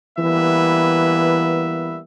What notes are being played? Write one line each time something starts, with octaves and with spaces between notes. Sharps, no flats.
E3 G3 A#3 B3 B4 E5